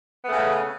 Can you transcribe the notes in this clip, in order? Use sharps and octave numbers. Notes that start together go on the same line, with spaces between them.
C#3 A3 B3